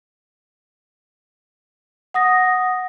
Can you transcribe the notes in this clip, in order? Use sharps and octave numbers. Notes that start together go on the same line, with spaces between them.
F#5 D#6 A#6